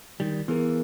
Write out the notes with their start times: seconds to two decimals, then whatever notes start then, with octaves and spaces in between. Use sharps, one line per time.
0.20 D#3 G3
0.48 E3 B3 G#4 A#4